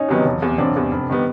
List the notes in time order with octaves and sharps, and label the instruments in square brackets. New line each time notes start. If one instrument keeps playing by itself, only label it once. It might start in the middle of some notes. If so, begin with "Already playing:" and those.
Already playing: [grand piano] C#4 D#4
[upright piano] C3 D#3 F#3 B3
E1
E2 C3
[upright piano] E1 [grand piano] C4 D4
[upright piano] E2 C3
F1
D#3 G3 B3